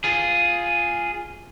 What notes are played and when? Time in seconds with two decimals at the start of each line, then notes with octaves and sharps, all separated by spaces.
0.04 F4 G#4